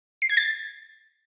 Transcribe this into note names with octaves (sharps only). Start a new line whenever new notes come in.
C7
G#6
A6